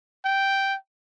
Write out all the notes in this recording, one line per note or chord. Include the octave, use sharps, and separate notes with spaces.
G5